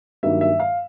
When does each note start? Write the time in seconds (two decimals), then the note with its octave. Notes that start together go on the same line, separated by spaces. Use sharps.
0.23 G2 D#3 F#3 A#3 D#4 E5
0.41 E5
0.60 F5